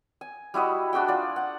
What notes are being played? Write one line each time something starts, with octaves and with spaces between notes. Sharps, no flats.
G#5
G3 E4 F#4 D#5
D4 F#4 G#4 G5
F4 D5
F#5